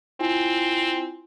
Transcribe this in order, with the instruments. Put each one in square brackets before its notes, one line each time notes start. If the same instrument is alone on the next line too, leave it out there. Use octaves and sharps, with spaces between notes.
[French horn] C4 [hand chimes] E4 F4 G#5